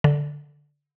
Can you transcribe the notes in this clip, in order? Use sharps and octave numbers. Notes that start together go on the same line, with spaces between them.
D3